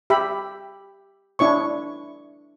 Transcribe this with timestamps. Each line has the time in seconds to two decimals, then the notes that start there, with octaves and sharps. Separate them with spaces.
0.10 G4 E5 B5
1.39 D4 E4 C#5 C#6